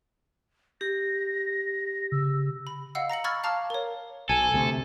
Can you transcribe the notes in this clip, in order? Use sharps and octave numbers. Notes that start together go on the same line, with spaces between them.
G4 A#6
C#3 E6
B5
D#5 F5 F#5 E6
A#5 A#6 C#7 F#7
B5 C#6 E6 F6 G#6 A6
F5 A5 A#5 D6 F6
A#4 C#5
B1 A4 G#5
D2 C3